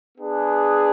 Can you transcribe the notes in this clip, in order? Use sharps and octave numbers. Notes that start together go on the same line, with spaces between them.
B3 D4 G#4